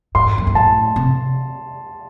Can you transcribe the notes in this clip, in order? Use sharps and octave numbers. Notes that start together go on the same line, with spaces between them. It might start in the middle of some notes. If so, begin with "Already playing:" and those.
G#2 C6
F#2
G#2
A2 A5
C3